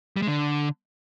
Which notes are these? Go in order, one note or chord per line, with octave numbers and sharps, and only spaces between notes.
G3
G#3
D3